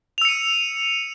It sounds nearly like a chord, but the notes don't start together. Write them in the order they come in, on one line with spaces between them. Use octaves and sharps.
F7 E6 C#7 D#7